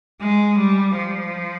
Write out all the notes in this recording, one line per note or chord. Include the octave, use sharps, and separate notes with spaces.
G#3
G3
F3